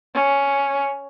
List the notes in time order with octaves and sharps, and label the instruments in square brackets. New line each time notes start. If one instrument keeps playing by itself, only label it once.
[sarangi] C#4